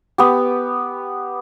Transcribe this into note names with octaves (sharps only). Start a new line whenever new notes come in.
B3 G4